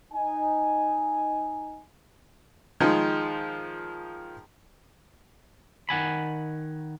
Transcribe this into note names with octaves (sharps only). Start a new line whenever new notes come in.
D#4 G#5
D#3 F3 G#3
D#3 F#5 G#5 B5